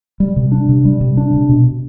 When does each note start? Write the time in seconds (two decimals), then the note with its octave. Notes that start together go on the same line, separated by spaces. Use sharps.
0.20 G3
0.36 C3
0.52 D4
0.69 C3
0.85 G3
1.01 C3
1.17 D4
1.34 C3
1.49 B2